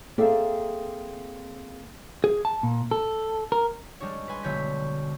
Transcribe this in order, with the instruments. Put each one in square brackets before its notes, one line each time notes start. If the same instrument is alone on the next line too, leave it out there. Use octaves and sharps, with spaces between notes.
[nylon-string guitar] A#3 C4 G#4 A4 D5 E5
[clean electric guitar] G#4
A5
A#2
A4
A#4
[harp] G3 G#3 D4 C#5
B4 G#5 C6
B1 D3 C#5 G6 B6